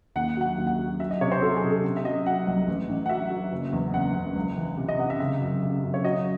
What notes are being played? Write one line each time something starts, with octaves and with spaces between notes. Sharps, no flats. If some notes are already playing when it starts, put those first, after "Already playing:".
D#2 F#5
F#3 F#5
D#2
F#5
F#3
F#3 E5
D#5
C3 C#5
C5
F#3 A4
G#4
C3
A4
C3
E5
F#3 D#5
F#3 F#5
C2
A1
A1
F#5
F#3 E5
F#3
F#1
E2
F#1 F#5
F#1
C#2
E3
C3
D#5
C3 F#5
E5
C#3 E5
F#2
C#3
F#2
C#5
F#3 D#5